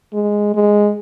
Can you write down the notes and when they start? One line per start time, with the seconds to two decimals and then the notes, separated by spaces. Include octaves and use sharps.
0.13 G#3
0.54 G#3